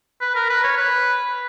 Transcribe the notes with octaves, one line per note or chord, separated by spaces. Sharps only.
B4
A#4
B4
C#5
B4